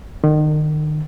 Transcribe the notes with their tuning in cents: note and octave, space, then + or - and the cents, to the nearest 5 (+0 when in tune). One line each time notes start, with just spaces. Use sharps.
D#3 -35